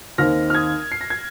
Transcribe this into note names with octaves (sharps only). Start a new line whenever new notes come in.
D#2 D#3 C4 F6 A#6
F6
D#6 G#6
C7
A#6
G#6